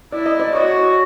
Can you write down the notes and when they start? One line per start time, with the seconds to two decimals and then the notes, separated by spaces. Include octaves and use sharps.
0.13 E4 D5
0.26 D#5
0.40 C5 D5
0.55 F#4 C#5 D#5